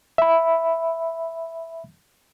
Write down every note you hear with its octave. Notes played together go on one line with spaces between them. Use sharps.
E5 B5